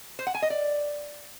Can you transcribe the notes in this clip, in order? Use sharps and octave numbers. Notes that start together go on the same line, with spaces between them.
C5
F#5
G#5
D#5
D5